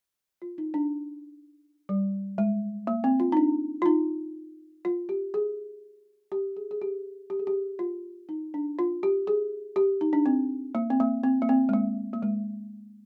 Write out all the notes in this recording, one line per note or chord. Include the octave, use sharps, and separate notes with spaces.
F4
D#4
D4
G3
G#3
A#3
C4
F4
D#4
D4
F4
D#4
F4
G4
G#4
G4
G#4
G#4
G4
G4
G#4
G4
F4
D#4
D4
F4
G4
G#4
G4
D#4
D4
C4
A#3
C4
A#3
C4
A#3
C4
G#3
A#3
A#3
G#3